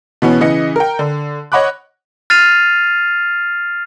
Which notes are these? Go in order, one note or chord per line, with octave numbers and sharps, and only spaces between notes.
B2 E3 B3 C#4
C#3 E3 D#5 C#7
A#4 G5
D3
C#5 D#5 F#5 B5 D6 F#6
F6 A6 C7 D#7 F7